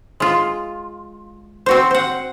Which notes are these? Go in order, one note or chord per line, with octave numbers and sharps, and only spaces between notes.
G#3 F4
C4 F#4 C5
C5 F#5